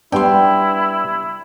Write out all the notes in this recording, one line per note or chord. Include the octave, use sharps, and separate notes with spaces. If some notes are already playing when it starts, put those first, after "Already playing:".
G3 B3 D4 E4 G5 C6